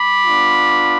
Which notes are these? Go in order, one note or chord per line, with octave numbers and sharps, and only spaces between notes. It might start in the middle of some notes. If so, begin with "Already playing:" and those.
Already playing: B5 D6
B3 D4 F4